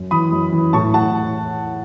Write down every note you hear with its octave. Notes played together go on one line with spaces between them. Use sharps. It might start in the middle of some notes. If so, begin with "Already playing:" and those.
Already playing: F#2
E3 B5 D#6
F#2
E3
A2 A5 C#6
A2 F#5 A5